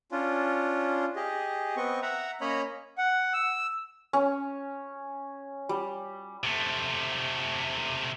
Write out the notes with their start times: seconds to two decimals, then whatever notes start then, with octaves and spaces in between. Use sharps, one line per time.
0.12 C#4 D4 F4
1.16 G4 G#4 D#5
1.77 B3 C4 D#5 C#6
2.02 E5 F#5 A#5
2.41 A#3 C#4 C#5 D#5 A#5 B5
2.98 F#5
3.33 E6
4.13 C#4
5.69 G3
6.43 C3 A3